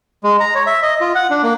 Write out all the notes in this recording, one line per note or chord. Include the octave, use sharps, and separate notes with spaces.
G#3
A#5
C#5
E5
D#5
F4
F#5
D4
A#3